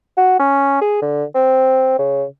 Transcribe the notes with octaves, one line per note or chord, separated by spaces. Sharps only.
F#4
C#4
G#4
D3
C4
C#3